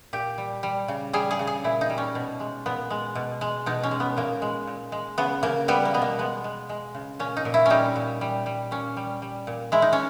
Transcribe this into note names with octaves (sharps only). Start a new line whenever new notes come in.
A#2 G4
G3
G3
C#3
G3 G#4
G#4
C#3
G#4
A#2 E4
D#4
G3
C#4
B2
G#3
A#2 B3
G#3
B2
G#3
B2 D#4
C#4
G#3
B3
A#2 A#3
G#3
A#2
G#3
C#3 B3
C#3 A#3
G3 B3
A#3
B2 B3
A#3
G#3 B3
G#3
G#3
C#3
A#2 C#4
D#4
A#2
E4
G3 C#4 D#4
A#2
G3
G3
A#2 C#4
G3
G3
A#2
G#3 E4
D#4
C#4